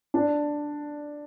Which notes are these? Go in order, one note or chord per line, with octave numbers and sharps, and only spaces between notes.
D4